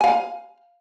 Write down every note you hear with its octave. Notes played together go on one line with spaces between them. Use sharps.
F5 G#5